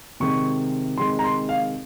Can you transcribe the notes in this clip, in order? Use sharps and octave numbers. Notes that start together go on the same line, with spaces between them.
C3 D#3 G#3 C#6
C3 D#3 G#3 C6
A#5
C6
F5